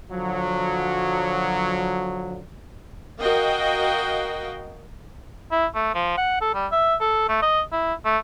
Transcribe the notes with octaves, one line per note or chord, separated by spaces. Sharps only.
D3 F3 F#3
F#4 A#4 D#5 F5 G5
E4
A3
F3
F#5
A4
G3
E5
A4
A3
D#5
E4
A3